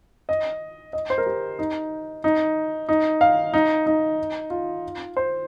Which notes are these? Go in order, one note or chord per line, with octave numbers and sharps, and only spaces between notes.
D#5
D#5
C5
A#4
G4
D#4
D#4
D#4
F5
D#4
D#4
F4
C5